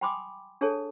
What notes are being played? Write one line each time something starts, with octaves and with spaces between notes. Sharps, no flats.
G5 G#5 B5 C6 D6 D#6
D4 G#4 A4 C#5 A5